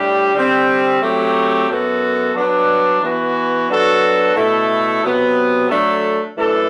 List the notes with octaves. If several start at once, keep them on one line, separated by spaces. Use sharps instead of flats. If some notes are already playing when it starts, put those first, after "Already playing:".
Already playing: A2 G3 D4 G4
D3 G3 C4 G4
F#3 A3 C4 G4
F#2 F#3 B3 F#4 A4
F#3 B3 D4
E3 B3 F#4
F#3 B3 D4 F#4 A4
B2 A3 E4 A4
C3 F#3 B3
F#3 A3 D4 A4
F#2 E3 A3 D4 A4